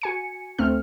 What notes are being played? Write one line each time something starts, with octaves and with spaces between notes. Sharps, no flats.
F#4 G#5 C#7
D2 A3 C4 F6